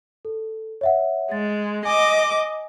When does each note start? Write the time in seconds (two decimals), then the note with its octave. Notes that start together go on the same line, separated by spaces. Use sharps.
0.25 A4
0.81 C#5 E5 F#5
1.32 G#3 A6
1.85 D#5 G#5 D6